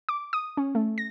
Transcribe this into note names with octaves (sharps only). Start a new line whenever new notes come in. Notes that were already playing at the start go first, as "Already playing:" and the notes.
D6
D#6
C#4
A3
A#6